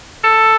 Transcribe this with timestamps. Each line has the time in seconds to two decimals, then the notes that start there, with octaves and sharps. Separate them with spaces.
0.24 A4